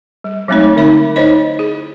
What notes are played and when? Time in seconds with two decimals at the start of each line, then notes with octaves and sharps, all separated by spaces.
0.24 G3
0.48 F#3 G#3 A3 C4 D#4 C#5
0.76 D3 D#4 E5 B5
1.16 D#4 E4 C5 C#5 D#5
1.59 G#4